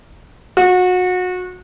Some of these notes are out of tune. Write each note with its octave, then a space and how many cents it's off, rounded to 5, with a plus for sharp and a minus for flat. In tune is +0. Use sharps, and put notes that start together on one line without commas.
F#4 -25